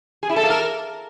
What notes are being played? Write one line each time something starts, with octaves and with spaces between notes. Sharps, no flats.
G#4
E4
A4
A#3
A#4